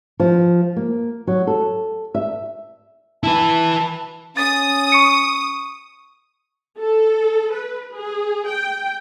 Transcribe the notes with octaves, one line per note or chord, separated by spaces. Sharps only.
F3
A#3
F#3
A4
E5
E4 B4 A5
C#4 D#6 A6
C#6 C#7 D#7
A4
B4
G#4
G5